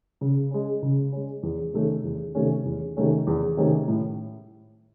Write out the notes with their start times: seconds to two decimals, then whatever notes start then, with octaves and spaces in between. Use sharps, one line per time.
0.21 C#3
0.51 G#3 C#4
0.82 C#3
1.12 G#3 C#4
1.43 E2
1.73 C3 D#3 A3 C#4
2.04 E2
2.35 C3 D#3 A3 C#4
2.65 E2
2.97 C3 D#3 A3 C#4
3.27 E2
3.57 C3 D#3 A3 C#4
3.88 A2